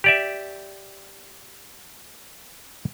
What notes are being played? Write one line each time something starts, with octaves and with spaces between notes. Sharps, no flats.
G4 D5 E5